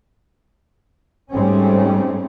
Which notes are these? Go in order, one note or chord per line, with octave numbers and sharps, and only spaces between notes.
G#2 G3 A3 C4 C#4